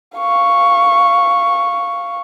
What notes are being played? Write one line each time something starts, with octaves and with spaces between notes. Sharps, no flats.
F5 C#6